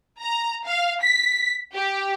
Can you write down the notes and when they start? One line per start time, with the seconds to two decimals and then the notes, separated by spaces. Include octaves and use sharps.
0.20 A#5
0.65 F5
1.01 B6
1.73 G4